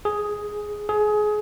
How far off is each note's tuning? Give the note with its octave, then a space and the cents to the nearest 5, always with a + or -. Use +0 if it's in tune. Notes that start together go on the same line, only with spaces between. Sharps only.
G#4 +5
G#4 +25